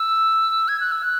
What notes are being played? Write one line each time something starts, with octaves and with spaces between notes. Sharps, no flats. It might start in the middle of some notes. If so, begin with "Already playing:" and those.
Already playing: E6
G#6
F#6
E6
F#6